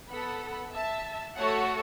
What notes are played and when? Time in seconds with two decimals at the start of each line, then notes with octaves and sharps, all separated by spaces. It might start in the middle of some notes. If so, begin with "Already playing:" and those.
0.10 B3 A4 F#5 B5
0.74 E5 A5
1.37 A3 F#4 A4 C#5 F#5